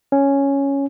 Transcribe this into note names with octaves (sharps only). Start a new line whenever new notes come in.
C#4